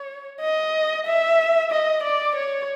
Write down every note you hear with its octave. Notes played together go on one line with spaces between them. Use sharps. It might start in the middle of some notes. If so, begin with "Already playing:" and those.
Already playing: C#5
D#5
E5
D#5
D5
C#5